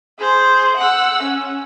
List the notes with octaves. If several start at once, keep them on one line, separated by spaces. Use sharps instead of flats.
G#4 C5
F#5 E6
C#4